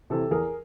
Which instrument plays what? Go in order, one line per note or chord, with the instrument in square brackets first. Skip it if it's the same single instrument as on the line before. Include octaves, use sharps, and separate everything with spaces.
[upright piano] C3 E3 G4 A4
E2 G#4 A#4